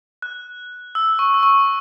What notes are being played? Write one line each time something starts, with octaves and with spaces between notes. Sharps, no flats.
F#6
E6
C#6
E6
C#6